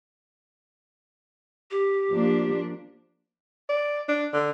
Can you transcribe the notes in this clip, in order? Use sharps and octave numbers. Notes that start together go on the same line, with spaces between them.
G4
F3 A#3 D4
D5
D4
D3